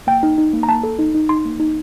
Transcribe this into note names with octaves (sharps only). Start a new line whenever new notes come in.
A#3 G5
D#4
D#4
A#3
A#5
A#3 A5
A4
D#4
D#4
D#4 C6
A#3
D#4